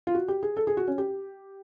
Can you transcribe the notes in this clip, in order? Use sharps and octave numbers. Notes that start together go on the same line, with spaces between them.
F4
F#4
G4
G#4
A4
G#4
F#4
C#4
G4